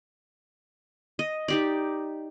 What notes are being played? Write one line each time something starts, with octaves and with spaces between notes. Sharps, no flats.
D#5
D#4 G4 D5